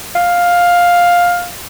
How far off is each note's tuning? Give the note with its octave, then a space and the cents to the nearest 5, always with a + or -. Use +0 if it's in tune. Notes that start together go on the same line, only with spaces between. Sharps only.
F5 +10